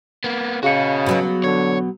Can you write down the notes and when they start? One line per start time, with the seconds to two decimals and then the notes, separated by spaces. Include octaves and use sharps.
0.24 A#3 B3
0.63 C#3 F#4 G#4 D#5 F5 C#7
1.06 B2 F#3 B3
1.44 D3 C#5